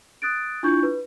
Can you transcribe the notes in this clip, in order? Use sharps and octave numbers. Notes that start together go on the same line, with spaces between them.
D#6 F#6 A6 D7
D4 E4 F4 C#6 G6 G#6
B4